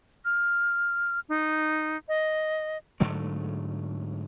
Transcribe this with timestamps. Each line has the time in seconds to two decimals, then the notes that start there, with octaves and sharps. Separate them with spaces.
0.25 F6
1.29 D#4
2.08 D#5
3.00 G#2 D3 F#3 A3